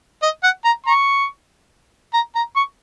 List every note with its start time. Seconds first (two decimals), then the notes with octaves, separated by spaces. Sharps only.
0.22 D#5
0.43 F#5
0.64 A#5
0.87 A#5 C#6
2.14 A#5
2.35 A#5
2.56 C#6